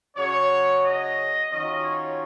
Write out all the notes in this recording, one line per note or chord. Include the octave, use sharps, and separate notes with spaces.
C#3 F#3 C#4 C#5
D#5
D#3 F#3 C#4 F4 D#5
C#5